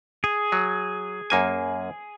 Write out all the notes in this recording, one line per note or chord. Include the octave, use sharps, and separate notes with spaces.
G#4
F#3
F#2 A#3 G#5